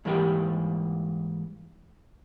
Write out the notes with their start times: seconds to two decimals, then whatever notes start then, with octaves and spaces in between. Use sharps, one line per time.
0.05 G#2 E3 G3 A#3 G4